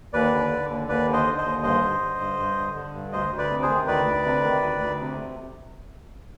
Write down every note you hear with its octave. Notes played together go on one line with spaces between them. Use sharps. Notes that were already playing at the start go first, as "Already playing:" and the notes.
D#2 B4 D5
D3
D3
D#2
D#2 B4 D5
D3
C5 D#5
D3
C5 D#5
D#2
G2 C5 D#5
D3
D3
G2
G2
D3
D3
G2
D2 C5 D#5
D2
B4 D5
C3
G#4 C5
D#3
D2 B4 D5
D2
C3
D#3
D2
D2
C3